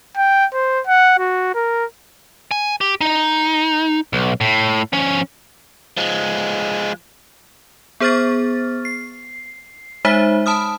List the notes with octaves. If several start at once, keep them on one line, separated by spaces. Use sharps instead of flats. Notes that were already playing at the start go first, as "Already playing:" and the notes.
G5
C5
F#5
F#4
A#4
G#5
G4
D#4
B1
A2
F3 C#4
F3 G#3
B3 G#4 C5 C#6 F6 A6
C7
G#3 D#4 C5 E5 B6
A5 B5 D#6 F6